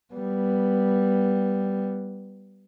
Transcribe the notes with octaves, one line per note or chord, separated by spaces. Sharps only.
G3 B3